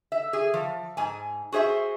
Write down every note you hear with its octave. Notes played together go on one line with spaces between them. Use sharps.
E5
G#4
F3
G#2 G#5
F#4 G#4 C5 E5